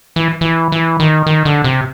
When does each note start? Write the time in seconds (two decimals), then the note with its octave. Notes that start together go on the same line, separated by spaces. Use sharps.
0.16 E3
0.41 E3
0.72 E3
1.00 D#3
1.27 D#3
1.45 D3
1.64 C3